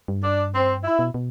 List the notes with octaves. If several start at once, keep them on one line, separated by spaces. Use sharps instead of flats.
G2
D4
C4
E4
B2
B2